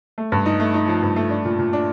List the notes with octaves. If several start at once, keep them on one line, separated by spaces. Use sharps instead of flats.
A3
G2
D#4
A3
D#4
F3
G2
A3
D4
A#2
A#2
D4